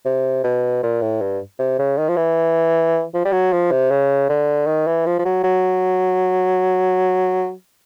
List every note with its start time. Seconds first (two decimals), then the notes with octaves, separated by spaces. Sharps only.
0.05 C3
0.44 B2
0.83 A#2
1.02 A2
1.22 G2
1.59 C3
1.79 C#3
1.98 D#3
2.08 F3
2.17 E3
3.14 F3
3.25 G3
3.32 F#3
3.52 F3
3.71 C3
3.91 C#3
4.29 D3
4.67 D#3
4.87 E3
5.06 F3
5.19 F3
5.25 F#3
5.44 F#3